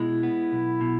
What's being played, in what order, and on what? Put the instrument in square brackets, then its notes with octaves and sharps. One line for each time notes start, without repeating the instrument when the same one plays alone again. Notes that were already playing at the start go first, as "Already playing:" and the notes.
Already playing: [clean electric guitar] B2 G#3 [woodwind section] E4
[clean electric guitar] B3
B1
B2